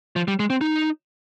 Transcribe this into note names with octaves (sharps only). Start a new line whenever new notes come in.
F3
G3
G#3
C4
D#4